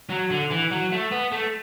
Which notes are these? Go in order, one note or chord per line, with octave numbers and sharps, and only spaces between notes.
F#3
D3
E3
F#3
A3
B3
A3